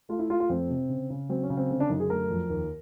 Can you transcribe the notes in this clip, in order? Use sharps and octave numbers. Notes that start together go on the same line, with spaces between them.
A3 F4
E4
A3 F4
F4
F2 C4
C3
C#3
C#3
F#3 C4
C#4
C#3
C4
D3 C4
D4
F#2 D#4
G#4
A3 A#4
F2
D#2